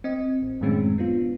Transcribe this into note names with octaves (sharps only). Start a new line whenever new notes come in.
C4 D#5
A1
F#2 A2 D#3 G#3 C4 C#4
B3 D4 F4